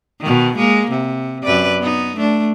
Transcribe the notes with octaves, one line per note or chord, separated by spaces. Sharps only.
B2 D#3
G#3 A#3
C3
F#2 B4 D5
B3 D#4
A3 D4